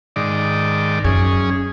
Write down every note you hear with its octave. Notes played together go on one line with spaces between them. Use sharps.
G#2 D#3 D5
F#2 C#4 G#4